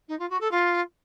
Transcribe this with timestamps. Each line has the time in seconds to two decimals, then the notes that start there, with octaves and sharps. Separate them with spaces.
0.08 D#4
0.19 F4
0.30 F#4
0.40 A4
0.51 F4